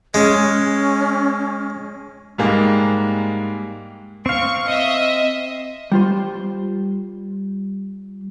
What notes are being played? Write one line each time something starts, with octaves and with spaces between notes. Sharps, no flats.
G#3 C#4
G#2 G3 G#3 A#3
C4 F5 C#6
D#5 E5
G3 F4 C5